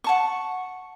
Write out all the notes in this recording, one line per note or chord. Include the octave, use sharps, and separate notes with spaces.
F#5 A5 C#6